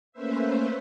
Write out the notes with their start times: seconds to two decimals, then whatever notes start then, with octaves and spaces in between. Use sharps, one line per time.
0.12 A3 A#3 C#4 B4 C5 E5